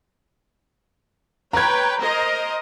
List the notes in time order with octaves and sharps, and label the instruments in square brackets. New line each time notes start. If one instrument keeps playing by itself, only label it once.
[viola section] B4 C#5 G5 [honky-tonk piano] A#5 G#6
[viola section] A#4 C5 D#5